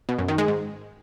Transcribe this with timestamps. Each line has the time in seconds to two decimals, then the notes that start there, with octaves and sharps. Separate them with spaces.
0.09 B2
0.19 F#2
0.28 D#3
0.38 G#3
0.48 G#2